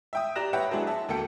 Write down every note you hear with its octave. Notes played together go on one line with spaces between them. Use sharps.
E5 G5 D#6
G4 D5 A#5 F#6 A#6 E7
B4 C#5 E5 F#5 G5
F#3 G#3 B3 D4 E4 G#4
E5 A5
D2 A#3 A4 G5 C#7